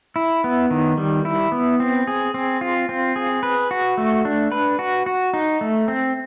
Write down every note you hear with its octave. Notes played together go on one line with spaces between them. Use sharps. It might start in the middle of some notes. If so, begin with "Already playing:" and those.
E4
B3
D#3
G3
E4
B3
C4
G#4
C4
F4
C4
G#4
B4
F#4
A3
D4
B4
F#4
F#4
D#4
A3
C4